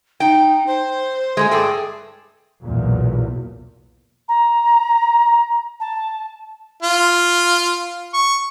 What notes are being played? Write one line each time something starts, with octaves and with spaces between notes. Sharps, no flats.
D#4 G5
C5
G#3 A3 G#4
G2 G#4 A4 G5
B1 E2 A#2
A#5
A5
F4
C#6